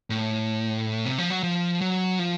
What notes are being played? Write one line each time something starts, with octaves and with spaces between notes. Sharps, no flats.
A2
C3
F3
F#3
F3
F#3
F3